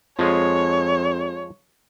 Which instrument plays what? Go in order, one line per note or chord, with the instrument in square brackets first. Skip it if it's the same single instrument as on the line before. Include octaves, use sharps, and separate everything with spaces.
[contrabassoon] F2 [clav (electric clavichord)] F3 G#3 G#4 [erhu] C#5